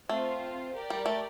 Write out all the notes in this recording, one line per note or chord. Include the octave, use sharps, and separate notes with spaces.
A3 C4 F4 C5
G4 A#4 D5
G3
A3